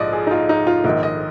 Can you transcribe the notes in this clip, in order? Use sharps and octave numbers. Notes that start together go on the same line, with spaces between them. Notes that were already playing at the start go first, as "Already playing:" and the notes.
Already playing: A#1 G#2 F3 D5 D#5
G#4
D#4
F4
D#4
F4
A#1 G#2 D#3
D#5